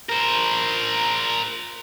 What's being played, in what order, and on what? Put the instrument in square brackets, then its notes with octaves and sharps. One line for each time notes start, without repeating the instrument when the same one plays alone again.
[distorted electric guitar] A#4 C5